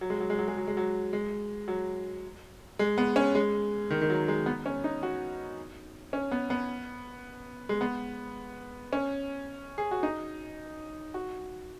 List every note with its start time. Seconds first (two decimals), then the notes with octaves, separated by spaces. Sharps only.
0.01 F#3
0.10 G#3
0.20 F#3
0.30 G#3
0.39 F#3
0.48 G#3
0.57 F#3
0.67 G#3
0.77 F#3
1.13 G#3
1.68 F#3
2.79 G#3
2.98 B3
3.16 C#4
3.35 G#3
3.90 D#3
4.01 D#3
4.10 F#3
4.28 G#3
4.46 B3
4.66 C#4
4.84 D#4
5.03 F#4
6.13 C#4
6.32 B3
6.50 B3
7.69 G#3
7.81 B3
8.93 C#4
9.78 G#4
9.91 F#4
10.03 D#4
11.14 F#4